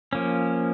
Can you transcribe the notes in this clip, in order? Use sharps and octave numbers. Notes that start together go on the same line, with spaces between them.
F3 A#3 C#4